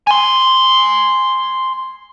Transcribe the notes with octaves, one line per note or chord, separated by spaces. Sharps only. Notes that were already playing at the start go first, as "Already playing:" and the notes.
G#5 C6